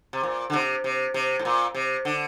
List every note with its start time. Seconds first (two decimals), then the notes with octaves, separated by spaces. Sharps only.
0.13 C3
0.23 A#2
0.50 D3
0.53 C3
0.84 C3
1.14 C3
1.39 A2
1.45 A#2
1.75 C3
2.05 D3